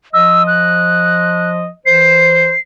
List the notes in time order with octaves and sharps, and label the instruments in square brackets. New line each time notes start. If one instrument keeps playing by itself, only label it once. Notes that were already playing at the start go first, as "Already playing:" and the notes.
[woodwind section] F3 D#5 [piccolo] E6
[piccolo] F#6
[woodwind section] E3 C5 [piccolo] C7